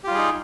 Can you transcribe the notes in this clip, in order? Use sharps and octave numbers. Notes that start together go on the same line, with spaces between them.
G3 D#4 F4 G4 G#4